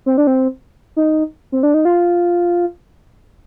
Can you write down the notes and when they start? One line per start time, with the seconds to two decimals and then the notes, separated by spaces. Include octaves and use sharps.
0.06 C4
0.18 D4
0.27 C4
0.96 D#4
1.52 C4
1.63 D4
1.74 D#4
1.85 F4